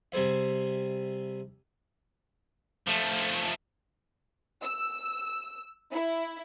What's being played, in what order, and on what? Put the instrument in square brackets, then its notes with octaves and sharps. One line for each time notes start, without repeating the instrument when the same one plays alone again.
[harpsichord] C3 G3 G#4 C5 E5
[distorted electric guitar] F3 A3
[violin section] E6
E4